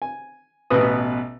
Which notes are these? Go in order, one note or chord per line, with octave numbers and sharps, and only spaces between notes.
G#5
A1 B2 B3 B4 D#6